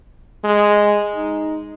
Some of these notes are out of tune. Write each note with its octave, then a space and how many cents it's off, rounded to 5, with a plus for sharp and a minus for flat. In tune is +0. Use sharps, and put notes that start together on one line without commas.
G#3 -5
D#4 +5